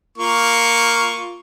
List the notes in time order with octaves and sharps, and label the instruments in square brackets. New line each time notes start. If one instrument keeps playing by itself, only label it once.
[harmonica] A#3 F4 C#6